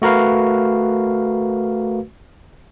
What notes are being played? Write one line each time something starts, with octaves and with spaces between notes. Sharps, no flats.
A3 F#4 A#4 B4 F5